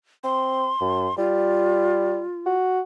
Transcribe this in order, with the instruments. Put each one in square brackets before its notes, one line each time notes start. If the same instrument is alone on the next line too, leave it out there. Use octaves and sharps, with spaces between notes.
[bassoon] C4 [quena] C6
[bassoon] F#2
[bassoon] G3 [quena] F4
[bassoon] F#4